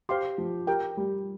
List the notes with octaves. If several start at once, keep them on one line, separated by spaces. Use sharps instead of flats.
G4 C5 F5 C6
F3
G4 A#4 G5
G3